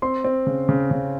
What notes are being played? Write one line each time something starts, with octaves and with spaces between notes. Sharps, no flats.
C4 C6
C4
C#3
C#3
C#3